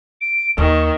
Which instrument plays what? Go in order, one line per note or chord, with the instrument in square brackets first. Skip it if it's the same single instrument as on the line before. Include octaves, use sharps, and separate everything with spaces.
[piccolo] D7
[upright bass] D#2 [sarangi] D#3 [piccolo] C#6